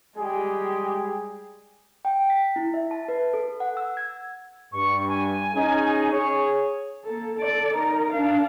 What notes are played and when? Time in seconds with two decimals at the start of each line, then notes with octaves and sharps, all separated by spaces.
0.17 G3 G#3 G4 G#4
2.05 G5
2.30 B6
2.56 E4
2.74 E5
2.91 A5
3.08 B4
3.34 A4
3.60 F#5
3.77 E6
3.97 G#6
4.72 G2 C#6
5.08 G#5
5.54 C#4 D#4 G#4
6.12 G#4 C#5
7.05 A#3 A4
7.37 A4 D5
7.74 D#4 A#4
8.12 D4 F5